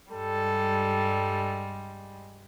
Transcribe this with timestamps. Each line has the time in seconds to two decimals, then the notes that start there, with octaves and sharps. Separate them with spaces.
0.11 G2 G3 G#3 A4